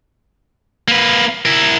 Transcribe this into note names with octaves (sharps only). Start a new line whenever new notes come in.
A#3 B4
E4 A#4